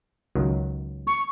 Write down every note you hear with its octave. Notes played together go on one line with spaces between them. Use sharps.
C#2 D#3 F#3
C#6